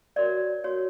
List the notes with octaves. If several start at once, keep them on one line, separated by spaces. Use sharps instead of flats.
F#4 A#4 C#5 D5
F#4 A#4 C#5